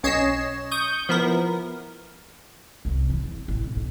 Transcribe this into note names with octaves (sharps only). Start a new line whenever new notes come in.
B1 C#4 C#5 D#5 C7 E7
C#6 D#6 G6
F3 B3 E4 A#4
C2 C#4
E3
E2
A1
B1
B1